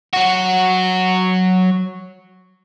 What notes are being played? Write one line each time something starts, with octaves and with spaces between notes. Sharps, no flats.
F#3 F#4